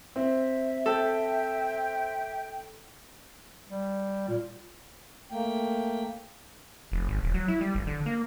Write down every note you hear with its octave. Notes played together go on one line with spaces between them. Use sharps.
C4 E5
A4 G5
G3
A#2
A3 A#3 G5
F1
G#1
E1
F#3
E4
G3
G1
D3
A#3